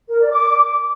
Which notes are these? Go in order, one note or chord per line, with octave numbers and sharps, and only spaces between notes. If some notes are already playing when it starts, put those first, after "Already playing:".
A#4
D5
D6